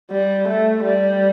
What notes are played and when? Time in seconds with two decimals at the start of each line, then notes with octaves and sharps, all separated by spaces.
0.11 G3
0.49 A3
0.85 G3